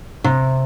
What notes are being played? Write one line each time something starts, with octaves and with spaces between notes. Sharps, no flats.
C3